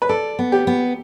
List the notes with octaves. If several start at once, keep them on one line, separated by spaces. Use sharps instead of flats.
B4
A4 D5
B3
G4
B3